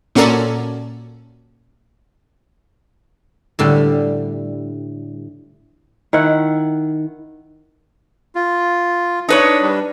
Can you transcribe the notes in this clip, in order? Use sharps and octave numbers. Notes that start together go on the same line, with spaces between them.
A#2 C#4 F#4 A4 A#4 D5
A2 D3 G3
D#3 E4 F#5
F4
D4 D#4 B4 C#5
G3 D4